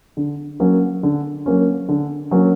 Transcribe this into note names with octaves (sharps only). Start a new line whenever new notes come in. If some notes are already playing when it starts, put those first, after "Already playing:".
D3
F#3 A#3 C#4
D3
F#3 A#3 C#4
D3
F#3 A#3 C#4